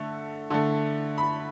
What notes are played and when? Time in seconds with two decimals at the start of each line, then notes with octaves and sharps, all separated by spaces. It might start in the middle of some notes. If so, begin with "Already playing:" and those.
Already playing: D3 A3
0.50 D3 A3
1.18 B5